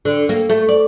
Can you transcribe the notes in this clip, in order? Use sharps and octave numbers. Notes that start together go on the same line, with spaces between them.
D3
A#3
A3
D5